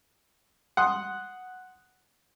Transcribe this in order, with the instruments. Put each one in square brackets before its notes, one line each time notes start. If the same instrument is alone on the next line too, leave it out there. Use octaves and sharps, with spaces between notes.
[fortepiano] F#5 C6 D#6